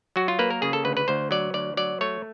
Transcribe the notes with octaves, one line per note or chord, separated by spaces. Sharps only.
F#3 F#4
F4
A#3 B4
A#4
C#3 G#4
A4
D2 B4
B4
D2 C5
F#3 D5
D2 D5
F#3 D5
A3 C#5